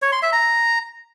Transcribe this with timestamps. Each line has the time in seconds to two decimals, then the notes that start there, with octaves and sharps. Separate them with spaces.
0.02 C#5
0.12 C6
0.22 E5
0.33 A#5